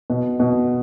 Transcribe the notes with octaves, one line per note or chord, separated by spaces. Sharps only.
B2
B2